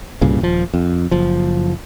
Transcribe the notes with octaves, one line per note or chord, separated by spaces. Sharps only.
C2 G2 A#2 C#3
D#1 F3
F2
F#1 F3